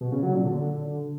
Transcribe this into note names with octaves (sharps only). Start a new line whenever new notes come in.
B2
C#3
F#3
A#2
D3